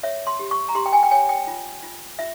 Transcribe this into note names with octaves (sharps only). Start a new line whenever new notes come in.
C#5 E5
C6
G4
C#6
A#5
G4 C6
G5
G#5
G5
C#5 G#5
G5
F4
F4
F4 E5